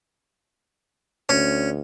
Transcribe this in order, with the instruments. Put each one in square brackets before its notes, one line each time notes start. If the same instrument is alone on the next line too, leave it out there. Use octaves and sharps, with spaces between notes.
[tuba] D2 [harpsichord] C#4